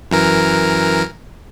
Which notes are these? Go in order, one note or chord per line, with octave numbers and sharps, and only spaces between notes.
F#2 E3 A#4